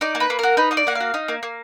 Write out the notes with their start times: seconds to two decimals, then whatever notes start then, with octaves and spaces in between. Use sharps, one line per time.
0.01 D#4 D5
0.15 A#3
0.20 B4
0.30 A#3
0.39 F#4 A#4
0.57 D#4 B4
0.71 A#3 D#5
0.77 D5
0.87 A#3 F#5
0.95 F5
1.00 F#4
1.14 D#4
1.28 A#3
1.43 A#3